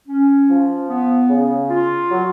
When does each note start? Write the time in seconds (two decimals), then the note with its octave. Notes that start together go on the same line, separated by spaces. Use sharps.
0.08 C#4
0.49 F3
0.89 B3
1.30 C#3
1.70 F4
2.10 F#3